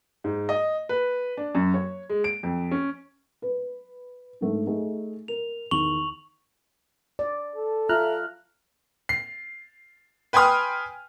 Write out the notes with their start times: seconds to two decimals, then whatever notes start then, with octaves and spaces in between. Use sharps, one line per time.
0.24 G#2
0.49 D#5
0.89 B4
1.37 D4
1.55 F#2
1.74 C#5
2.10 G#3
2.24 D7
2.43 F2
2.71 C#4
3.42 B4
4.41 G#2 A3 D4
4.67 A3 D#4 G#4
5.28 A#4 F7
5.71 E2 D#3 C#6 F7 F#7
7.19 D5
7.56 A4
7.89 F4 E5 A#5 F6 F#6
9.09 C7
10.33 B4 G5 G#5 C6 D#6 F6